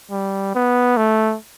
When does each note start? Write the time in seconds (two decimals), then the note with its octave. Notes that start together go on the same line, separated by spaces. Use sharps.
0.11 G3
0.55 B3
0.97 A3